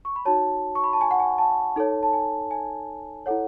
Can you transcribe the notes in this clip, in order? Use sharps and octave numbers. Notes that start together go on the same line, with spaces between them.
C#6
B5
D#4 F#4 C#5 A5
C#6
B5
A5
G#5
F#5
G#5
A5
D#4 A4 C#5
A5
G#5
G#5
E4 A4 C#5 F#5